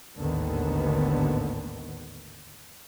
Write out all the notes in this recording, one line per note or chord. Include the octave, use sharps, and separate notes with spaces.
A1 D#2 G#2 D3 D#3 B3